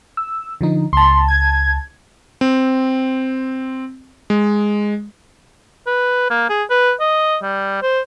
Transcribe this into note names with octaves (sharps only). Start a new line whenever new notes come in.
E6
D3 F3 D#4
C#2 A5 C6
G#6
C4
G#3
B4
A#3
G#4
B4
D#5
G3
C5